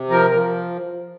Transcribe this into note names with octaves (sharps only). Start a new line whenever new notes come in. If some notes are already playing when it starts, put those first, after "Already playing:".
Already playing: C3
F3 A#4
F3